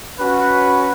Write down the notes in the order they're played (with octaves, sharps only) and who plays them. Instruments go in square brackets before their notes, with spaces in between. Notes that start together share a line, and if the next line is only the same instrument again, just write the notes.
[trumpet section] C#4 F#4 B4